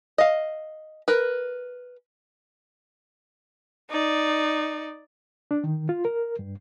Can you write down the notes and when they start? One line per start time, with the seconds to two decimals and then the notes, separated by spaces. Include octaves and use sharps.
0.18 D#5 F5
1.08 A#4 B4
3.90 D#4 D5
5.51 D4
5.64 D#3
5.89 F4
6.05 A#4
6.39 G2